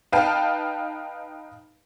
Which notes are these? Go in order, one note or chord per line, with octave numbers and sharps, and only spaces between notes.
D#4 B4 F5 G5 A5